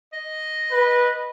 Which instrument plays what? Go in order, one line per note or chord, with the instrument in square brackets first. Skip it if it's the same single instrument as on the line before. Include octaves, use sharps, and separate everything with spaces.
[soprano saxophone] D#5
[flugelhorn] B4